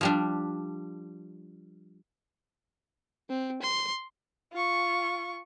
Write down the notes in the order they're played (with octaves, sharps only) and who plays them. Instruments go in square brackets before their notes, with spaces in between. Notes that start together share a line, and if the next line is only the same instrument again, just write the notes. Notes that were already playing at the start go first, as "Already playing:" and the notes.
[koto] F3 G3 D4
[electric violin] C4
C6
[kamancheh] F4 C#6